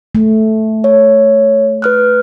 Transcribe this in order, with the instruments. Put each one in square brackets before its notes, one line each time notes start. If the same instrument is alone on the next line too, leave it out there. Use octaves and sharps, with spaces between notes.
[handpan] A3
[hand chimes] C#5
B4 F6 F#6